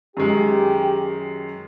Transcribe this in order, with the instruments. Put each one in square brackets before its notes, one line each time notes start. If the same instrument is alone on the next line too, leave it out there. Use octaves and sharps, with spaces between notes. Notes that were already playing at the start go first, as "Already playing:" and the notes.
[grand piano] F#2 D#3 G#3 [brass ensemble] G4